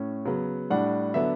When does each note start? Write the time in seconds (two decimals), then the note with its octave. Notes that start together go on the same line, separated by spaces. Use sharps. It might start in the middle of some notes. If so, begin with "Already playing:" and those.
Already playing: A2 C#4
0.25 C#3 F#3 B3
0.70 A2 G3 D4 F#5
1.14 D3 F#3 B3 D4 E5